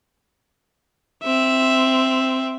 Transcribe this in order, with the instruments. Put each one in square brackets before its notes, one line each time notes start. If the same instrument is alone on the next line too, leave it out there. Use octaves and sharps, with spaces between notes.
[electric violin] C4 E5